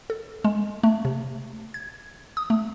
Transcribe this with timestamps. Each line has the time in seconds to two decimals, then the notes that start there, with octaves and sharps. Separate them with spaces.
0.10 A4
0.45 G#3
0.83 A3
1.05 C3
1.74 G#6
2.37 D#6
2.50 A3